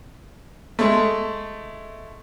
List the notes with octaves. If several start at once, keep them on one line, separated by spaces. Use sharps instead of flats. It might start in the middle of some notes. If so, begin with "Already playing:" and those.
G#3 A3